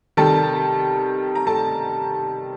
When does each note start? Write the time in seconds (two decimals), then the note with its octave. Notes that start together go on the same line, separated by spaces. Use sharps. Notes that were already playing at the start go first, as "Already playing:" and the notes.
0.17 C3 D#3 G3 A4 A5
1.35 A#5
1.47 A4 A5